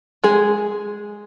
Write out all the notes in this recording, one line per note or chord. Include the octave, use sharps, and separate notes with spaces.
G#3 G#4